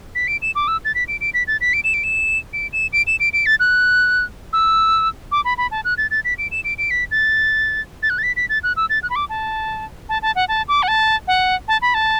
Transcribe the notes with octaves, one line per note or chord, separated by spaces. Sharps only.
B6
D7
E7
D6
E6
A6
B6
D7
D7
B6
A6
B6
D7
E7
D7
E7
D7
E7
D7
E7
D7
D7
A6
F#6
E6
D6
B5
B5
A5
F#6
A6
A6
B6
D7
E7
D7
D7
B6
A6
A6
F#6
A6
B6
B6
A6
F#6
E6
A6
F#6
B5
D6
A5
A5
A5
F#5
A5
D6
F#5
A5
F#5
A5
B5
A5